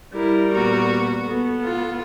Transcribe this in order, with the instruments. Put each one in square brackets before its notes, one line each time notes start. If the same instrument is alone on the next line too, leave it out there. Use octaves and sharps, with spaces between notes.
[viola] G3 A#4 [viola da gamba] E4
[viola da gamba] A#2 B3 F#4
[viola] B3 A4
[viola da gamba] F4